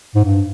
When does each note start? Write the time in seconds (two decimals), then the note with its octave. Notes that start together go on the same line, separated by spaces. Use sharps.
0.15 G#2
0.24 G2